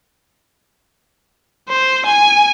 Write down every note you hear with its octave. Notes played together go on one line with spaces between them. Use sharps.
C5
G#5